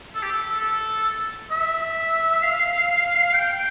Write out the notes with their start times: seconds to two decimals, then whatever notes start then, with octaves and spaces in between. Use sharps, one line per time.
0.15 A4
0.23 G4
0.31 A4
0.60 A4
1.51 E5
2.42 F5
3.33 G5